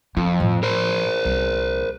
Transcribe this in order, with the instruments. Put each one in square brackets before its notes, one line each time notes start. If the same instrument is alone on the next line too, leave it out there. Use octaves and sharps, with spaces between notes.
[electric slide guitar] F2 [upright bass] F4
[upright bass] A2 F3
[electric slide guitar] A#4 C5
[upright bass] C2